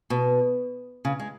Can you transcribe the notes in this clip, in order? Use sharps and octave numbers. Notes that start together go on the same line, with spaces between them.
B2
C#3
G#3